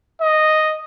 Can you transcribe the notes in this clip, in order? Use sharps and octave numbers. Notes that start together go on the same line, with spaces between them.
D#5